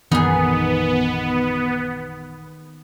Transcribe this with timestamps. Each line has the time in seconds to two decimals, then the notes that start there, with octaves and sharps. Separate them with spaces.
0.12 A#1 F#2 D#3 E3 B3 D#4 G#4